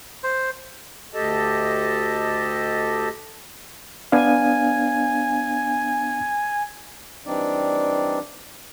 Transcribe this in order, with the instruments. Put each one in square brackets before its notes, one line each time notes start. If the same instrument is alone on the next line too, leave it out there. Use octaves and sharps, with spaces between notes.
[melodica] C5
[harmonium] D2 G4 A4 D#5 A5
[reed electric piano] B3 D4 F5 [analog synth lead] G#5
[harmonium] E3 G3 C4 D4 D#4 D5